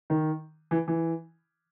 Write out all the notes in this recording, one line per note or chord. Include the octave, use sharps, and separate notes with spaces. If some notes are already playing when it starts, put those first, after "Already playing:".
D#3
E3
E3